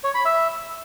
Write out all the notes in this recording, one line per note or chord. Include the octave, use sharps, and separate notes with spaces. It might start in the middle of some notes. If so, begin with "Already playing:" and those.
C#5
B5
E5